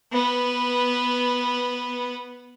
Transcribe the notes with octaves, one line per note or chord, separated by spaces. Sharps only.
B3 B4